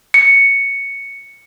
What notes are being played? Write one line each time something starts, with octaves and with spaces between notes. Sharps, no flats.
C#7